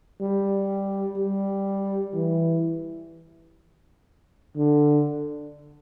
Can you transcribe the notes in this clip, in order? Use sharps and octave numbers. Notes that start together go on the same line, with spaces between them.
G3
G3
E3
D3